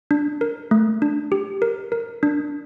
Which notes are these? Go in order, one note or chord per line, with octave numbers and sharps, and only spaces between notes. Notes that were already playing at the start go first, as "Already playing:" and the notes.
D4
A#4
A3
D4
G4
A#4
A#4
D4